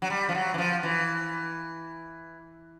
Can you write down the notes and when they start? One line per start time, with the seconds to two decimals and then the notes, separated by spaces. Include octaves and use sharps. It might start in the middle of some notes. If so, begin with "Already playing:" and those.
0.02 F#3
0.10 G3
0.29 F3
0.35 F#3
0.54 E3
0.58 F3
0.83 E3